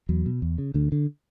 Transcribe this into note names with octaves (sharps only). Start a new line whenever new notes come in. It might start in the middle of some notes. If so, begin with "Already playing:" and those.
E2 F#3
B2
E2
C#3
D2 D3
D3